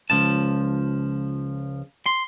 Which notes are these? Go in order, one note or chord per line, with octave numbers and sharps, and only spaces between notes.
C#2 F3 A5
C6